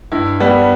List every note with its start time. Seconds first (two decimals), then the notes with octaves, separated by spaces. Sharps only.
0.12 G2 E4
0.40 G3 B3 D4